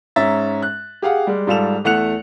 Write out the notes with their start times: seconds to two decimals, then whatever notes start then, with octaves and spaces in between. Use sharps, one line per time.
0.16 G#2 C#4 E5 A#5 A6
0.62 F#6
1.02 G4 G#4 F5 F#5
1.27 G3 G#3
1.47 G#2 G3 F4 A4 E7 F7
1.84 E2 A3 F#5 F#6 C#7 F7